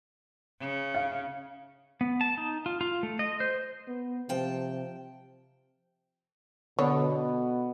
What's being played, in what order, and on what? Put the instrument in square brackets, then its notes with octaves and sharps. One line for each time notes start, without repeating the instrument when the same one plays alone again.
[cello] C#3
[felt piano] F5
[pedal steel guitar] B3
A5
D#4
F4
F4
A3
D#5
C5
[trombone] B3
[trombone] C3 [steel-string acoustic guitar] F3 G5 A5
[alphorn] B2 [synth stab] D3 [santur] B3 [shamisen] C#5